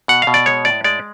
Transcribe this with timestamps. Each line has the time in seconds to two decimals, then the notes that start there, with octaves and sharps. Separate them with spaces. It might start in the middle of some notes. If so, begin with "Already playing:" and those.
0.08 B2 F#5
0.22 F5
0.27 B2
0.34 D5
0.46 G#3 C#5
0.65 A2 D5
0.84 G#3 D5